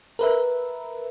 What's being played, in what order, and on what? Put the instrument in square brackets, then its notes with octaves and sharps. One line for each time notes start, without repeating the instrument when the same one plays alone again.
[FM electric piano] A#4 B4 E5